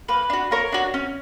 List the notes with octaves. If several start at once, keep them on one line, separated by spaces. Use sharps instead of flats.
A#3 B4
D4 F#4
A#3 A#4 C#5
D4 F#4
C#4